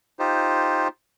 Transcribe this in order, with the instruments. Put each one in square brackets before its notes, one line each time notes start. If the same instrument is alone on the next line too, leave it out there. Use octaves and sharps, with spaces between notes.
[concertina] D#4 F4 G4 C5